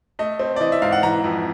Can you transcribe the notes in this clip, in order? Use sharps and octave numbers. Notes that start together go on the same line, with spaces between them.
A3 D#5
C4
D5
E3 D#5
E5
G#2 F5
F#5
E3 A#5
F2